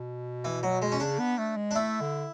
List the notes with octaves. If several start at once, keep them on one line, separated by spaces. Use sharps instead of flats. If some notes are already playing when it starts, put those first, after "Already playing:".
Already playing: B2
E3
F#3
G#3
C#4
C#3 D4
B3
A3
G#3
D4
A3 E4
D3